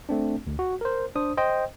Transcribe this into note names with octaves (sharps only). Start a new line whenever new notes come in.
A3 C4 D4
D2
F#4
A#4 C5
D4 C5 D#6
C5 D#5 G5